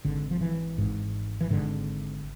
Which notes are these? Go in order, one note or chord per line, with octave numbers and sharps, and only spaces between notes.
G#1 G#2 D3
F3
E3
G#1 G#2
E3
G#1 G#2 D3